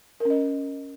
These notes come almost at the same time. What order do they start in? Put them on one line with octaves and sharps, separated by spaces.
A#4 C#4 D#5